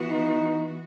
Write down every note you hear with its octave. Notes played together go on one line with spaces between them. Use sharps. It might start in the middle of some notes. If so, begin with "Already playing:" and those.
Already playing: E3 B3 F#4
D#4